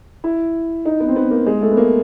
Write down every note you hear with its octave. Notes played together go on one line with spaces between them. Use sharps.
E4
D#4
B3
C4
B3
A#3
G#3
A3
B3
A#3